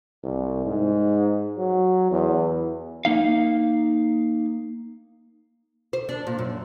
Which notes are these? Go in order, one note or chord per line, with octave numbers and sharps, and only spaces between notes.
C2
G#2
F#3
E2
A#3 D#4 F5
C5
D4
A#2
F#2